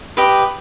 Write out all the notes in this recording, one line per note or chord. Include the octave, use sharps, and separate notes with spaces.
G4 B4 D#5